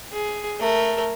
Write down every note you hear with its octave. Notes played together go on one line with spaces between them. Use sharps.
G#4
A3 A#4